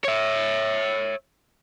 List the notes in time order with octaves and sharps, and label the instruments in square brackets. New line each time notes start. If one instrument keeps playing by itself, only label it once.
[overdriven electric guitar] C#5 E5